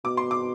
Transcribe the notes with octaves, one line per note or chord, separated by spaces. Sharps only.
B2 D6
C6
D6